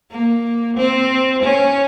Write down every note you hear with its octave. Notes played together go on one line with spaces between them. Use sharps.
A#3
C4
C#4